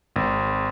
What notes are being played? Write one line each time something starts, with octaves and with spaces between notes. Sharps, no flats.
G#1